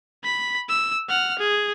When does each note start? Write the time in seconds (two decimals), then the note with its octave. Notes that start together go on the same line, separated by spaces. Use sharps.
0.24 B5 B6
0.69 E6
1.09 F#5 F6
1.38 G#4